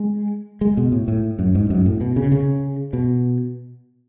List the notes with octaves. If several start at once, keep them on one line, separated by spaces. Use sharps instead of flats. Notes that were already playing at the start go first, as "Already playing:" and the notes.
Already playing: G#3
G#3
B2
A2
A2
F#2
G#2
F#2
A2
B2
C#3
C#3
B2